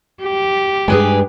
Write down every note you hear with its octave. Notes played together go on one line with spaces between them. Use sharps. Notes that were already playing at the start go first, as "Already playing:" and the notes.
G4
G2 G#3 G#4 B4 G#5